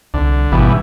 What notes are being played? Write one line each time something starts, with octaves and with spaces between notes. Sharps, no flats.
C2 D3
G#1 G2 B2 E3